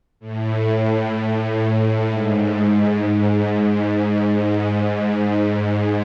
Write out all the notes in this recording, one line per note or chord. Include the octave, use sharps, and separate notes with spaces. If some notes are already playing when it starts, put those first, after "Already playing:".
A2
A2
G#2
G#2
G#2